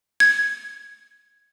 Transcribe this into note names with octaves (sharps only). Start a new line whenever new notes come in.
G#6